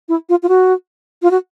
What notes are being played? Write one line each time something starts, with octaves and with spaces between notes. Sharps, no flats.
E4
F4
F4
F#4
F4
F#4